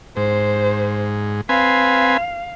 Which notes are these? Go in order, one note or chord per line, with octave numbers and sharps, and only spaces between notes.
G#2 C5
C4 B4 F5 G#5